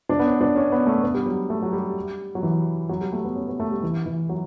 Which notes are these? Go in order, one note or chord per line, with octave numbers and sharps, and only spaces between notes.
D4
B3
C#4
D4
C#4
B3
A3
B3
G3
F#3
A3
F#3
G3
F#3
E3
F#3
G3
A3
B3
C#4
B3
A3
G3
E3
E3
F#3